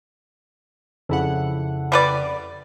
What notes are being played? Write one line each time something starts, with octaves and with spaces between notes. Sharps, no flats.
F2 C#3 E4 A4 F#5
G3 B4 D5